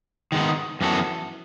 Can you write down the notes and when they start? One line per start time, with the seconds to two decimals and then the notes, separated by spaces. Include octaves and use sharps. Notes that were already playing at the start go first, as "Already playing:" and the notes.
0.32 D#3 G#3 B3 D#4
0.81 F#2 E3 B3 F#4 A4